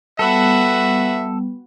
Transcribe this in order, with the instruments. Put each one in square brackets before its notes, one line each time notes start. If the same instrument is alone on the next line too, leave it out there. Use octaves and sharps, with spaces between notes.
[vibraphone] G3 B3 [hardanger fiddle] F#4 B4 [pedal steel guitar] A4 [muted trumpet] E5